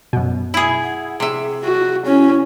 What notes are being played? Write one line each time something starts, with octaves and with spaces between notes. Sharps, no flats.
F#2 B2
E4 G#4 E5
F#5
C3 G#4 E5
F#4
C#4 E4